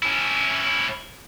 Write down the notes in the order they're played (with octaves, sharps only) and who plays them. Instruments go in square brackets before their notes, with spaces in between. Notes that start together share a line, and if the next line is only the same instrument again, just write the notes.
[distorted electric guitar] C#4 E4